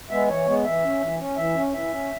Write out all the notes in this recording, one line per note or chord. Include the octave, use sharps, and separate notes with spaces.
G#3 B3 E5
E3 C#5
G#3 B3
E3 E5
C#4
E3
C#4
E3 E5
C#4
E3 E5
C#4